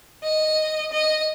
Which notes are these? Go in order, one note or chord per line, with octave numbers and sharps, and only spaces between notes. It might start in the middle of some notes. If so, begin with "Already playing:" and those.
D#5
D#5